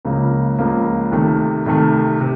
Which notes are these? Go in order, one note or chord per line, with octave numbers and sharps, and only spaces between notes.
C#2 C#3 F3 A#3
C#2 C#3 F3 A#3
C2 C3 D#3 A3
C2 C3 D#3 A3
C3